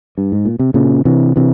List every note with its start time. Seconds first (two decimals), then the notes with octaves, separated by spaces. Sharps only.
0.18 G2
0.32 G#2
0.45 A#2
0.59 C3
0.74 A#2 C#3
1.05 C3 E3
1.36 C3 E3